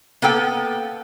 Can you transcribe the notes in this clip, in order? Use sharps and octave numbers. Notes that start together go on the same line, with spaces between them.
A#3 B3 A4 G5